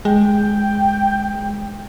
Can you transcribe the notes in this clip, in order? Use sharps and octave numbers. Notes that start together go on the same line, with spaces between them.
G#3 G5